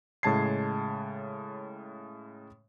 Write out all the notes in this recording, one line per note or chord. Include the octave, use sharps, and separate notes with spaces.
A2 C#3 G#3 A5 G#6 C7